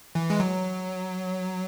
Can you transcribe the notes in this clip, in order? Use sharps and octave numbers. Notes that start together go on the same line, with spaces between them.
E3
G#3
F#3